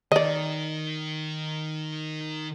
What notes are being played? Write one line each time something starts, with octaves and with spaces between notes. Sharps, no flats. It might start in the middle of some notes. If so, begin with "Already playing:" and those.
D#3 D5 D#5